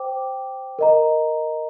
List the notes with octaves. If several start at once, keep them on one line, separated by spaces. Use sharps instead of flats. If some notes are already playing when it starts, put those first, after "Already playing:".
Already playing: C5 G5 D6
A#4 D#5 A#5